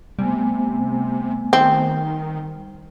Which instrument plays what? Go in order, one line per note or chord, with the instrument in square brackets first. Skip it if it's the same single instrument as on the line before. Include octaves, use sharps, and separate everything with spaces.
[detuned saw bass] C3 [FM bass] G3 [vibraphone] A3 B3 G#5
[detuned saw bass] D#3 [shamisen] C4